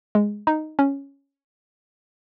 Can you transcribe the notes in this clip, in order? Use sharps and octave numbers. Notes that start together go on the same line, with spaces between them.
G#3
D#4
C#4